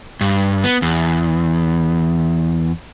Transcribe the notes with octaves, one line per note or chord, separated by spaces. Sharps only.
G2
B3
E2